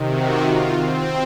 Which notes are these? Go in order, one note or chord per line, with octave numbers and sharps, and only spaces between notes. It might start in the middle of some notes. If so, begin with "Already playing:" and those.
Already playing: C3 D#3
F#4
F4
C4